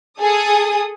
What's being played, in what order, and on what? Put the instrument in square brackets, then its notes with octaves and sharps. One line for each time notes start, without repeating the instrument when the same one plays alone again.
[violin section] G#4 A4 D#6